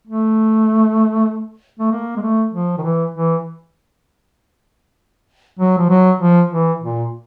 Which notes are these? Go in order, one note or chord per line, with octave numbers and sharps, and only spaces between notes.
A3
A3
A#3
G#3
A3
F3
D#3
E3
E3
F#3
F3
F#3
F3
E3
A#2